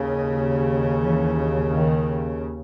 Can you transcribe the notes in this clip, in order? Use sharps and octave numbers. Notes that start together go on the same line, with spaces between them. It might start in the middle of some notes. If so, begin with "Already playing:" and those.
Already playing: D#2 C#3
E3
D#3